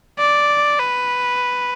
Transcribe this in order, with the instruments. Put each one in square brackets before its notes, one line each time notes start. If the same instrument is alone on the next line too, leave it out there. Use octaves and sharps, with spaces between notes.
[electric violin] D5
B4